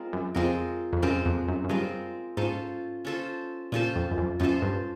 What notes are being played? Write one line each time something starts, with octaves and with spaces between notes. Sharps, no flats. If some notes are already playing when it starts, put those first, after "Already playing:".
Already playing: G#3 C4 F4 A#4
F#2
F2 G#3 C4 F4 A#4
F2
F#2 G#3 C4 F4 A#4
F2
F#2
F#2
G2 G#3 C4 F4 A#4
G#2 C#4 F4 A4 C5
C#4 F4 A4 C5
A#2 C#4 F4 A4 C5
F2
F#2
F2
F#2 C#4 F4 A4 C5
G2